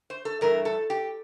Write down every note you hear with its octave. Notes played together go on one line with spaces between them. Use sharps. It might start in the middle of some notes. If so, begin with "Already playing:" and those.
C5
A4
G2 E3 A3 A#4
A4
G4